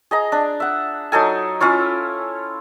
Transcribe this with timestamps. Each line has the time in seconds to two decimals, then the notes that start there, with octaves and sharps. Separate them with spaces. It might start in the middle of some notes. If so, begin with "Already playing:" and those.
0.11 G#4 D#5 A#5
0.32 D4
0.60 E5 F#5
1.12 F#3 D#4 A4 G#5
1.60 C#4 E4 F4 C#5